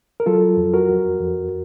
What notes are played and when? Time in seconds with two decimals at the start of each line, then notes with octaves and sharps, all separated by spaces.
0.20 A#4
0.26 F#3 F4 A4
0.57 F2
0.74 F#4 A#4
0.89 F2
1.20 F2